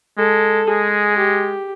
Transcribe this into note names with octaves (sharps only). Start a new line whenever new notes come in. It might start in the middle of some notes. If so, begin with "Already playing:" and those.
G#3 A4
G#3 G#4
G4